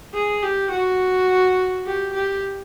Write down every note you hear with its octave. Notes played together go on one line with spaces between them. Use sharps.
G#4
G4
F#4
G4
G4